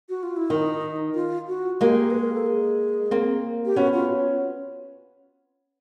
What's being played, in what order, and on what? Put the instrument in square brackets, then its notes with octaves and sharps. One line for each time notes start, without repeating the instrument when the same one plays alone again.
[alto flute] F#4
F4
E4
[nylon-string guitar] D#3 [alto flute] D#4
[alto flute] F4
F#4
[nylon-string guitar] G#3 A#3 [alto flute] G4
[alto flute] B4
A#4
A4
G#4
[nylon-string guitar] A#3 C4
[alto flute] G4
[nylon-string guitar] B3 C#4 [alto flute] F#4
[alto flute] F4